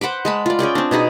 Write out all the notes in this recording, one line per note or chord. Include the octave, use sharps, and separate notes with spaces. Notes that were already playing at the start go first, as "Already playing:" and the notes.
C5 F#5 B5 D6
G#3 A5 B5
F4 D5
C#4 G#4 D5 G5
C4 D4
B2 B3 D#4 G#4